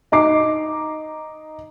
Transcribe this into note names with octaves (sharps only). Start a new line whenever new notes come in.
D#4 A#5 D6 C7